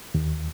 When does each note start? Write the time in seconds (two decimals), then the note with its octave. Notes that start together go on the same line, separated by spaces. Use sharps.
0.15 D#2